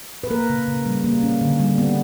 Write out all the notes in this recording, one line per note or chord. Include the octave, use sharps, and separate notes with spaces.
B4
A#3 A#4
C#3
C#3
G3
A#3
C#4
D3
G3
B3